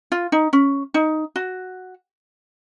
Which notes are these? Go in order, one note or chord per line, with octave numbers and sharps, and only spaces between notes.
F4
D#4
C#4
D#4
F#4